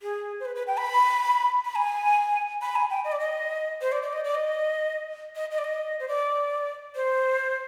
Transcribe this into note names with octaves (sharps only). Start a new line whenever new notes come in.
G#4
C5
B4
B4
G5
B5
B5
G#5
B5
G#5
G5
D#5
D5
D#5
C5
D5
D5
D#5
D5
D#5
D#5
D#5
D5
D#5
C5
D5
C5